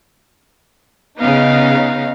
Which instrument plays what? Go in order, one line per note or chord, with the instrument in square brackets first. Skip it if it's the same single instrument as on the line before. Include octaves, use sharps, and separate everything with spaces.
[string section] C#3 D#4 [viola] B3 F5